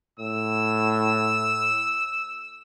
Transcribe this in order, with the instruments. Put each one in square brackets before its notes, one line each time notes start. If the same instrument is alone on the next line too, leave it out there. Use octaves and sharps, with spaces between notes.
[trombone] A2 [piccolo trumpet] E6